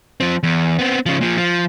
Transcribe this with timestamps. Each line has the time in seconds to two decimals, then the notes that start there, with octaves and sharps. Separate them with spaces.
0.20 F3 C4
0.43 E2
0.79 B3 C4
1.06 C#3 F3
1.21 A#2 F3
1.38 F3